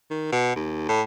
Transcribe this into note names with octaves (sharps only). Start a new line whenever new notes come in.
D#3
B2
D#2
A2